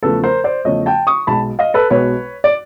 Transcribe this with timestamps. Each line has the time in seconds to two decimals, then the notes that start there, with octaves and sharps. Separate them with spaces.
0.03 E2 C#3 F3 A3 A4 B4
0.23 A#4 C5
0.44 C5 D5
0.65 E2 C#3 F3 A3 C#5 D#5
0.86 G5 A5
1.07 C#6 D#6
1.27 B1 B2 G#3 A5 B5
1.59 D#5 F5
1.74 A4 B4
1.90 B1 B2 G#3 B4 C#5
2.44 D5